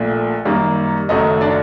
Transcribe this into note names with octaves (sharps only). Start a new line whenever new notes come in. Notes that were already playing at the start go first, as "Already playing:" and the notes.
Already playing: A#1 A#2 A3
F#2 D#3 G3 A#3
F#1 F#2 D#3 F#3 A3 D#4 D#5
D4 D5